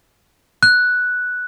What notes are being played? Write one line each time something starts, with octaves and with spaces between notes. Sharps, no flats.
F#6